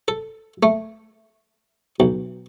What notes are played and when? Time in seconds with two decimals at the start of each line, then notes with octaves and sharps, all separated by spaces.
0.08 A4
0.63 A3
2.00 B1